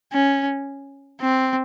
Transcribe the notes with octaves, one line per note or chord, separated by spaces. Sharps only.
C#4
C4